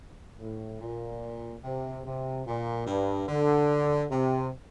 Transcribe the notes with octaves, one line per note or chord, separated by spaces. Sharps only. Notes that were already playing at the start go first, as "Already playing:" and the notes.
A2
A#2
C3
C3
A#2
G2
D3
C3